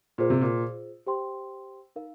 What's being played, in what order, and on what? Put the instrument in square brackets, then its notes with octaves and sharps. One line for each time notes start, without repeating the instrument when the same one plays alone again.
[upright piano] A#2 [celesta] F4 G#4 C5
[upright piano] C3
A#2
[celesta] G4 C5 G5 C6
D#4 A#4 F5